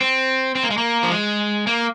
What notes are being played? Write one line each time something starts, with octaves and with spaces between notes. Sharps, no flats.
C4
C4
A#3
G#3
A#3
F3
G#3
A#3